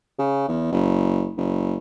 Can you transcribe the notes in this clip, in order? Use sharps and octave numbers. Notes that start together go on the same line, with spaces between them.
C#3
E2
F#1
F#1